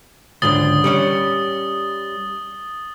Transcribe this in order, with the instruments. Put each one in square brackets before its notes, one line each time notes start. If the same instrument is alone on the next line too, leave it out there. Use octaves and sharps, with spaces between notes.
[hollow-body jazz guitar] C#2 G#2 D3 [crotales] D#6 A6 G7
[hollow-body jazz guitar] G3 C#4 C#5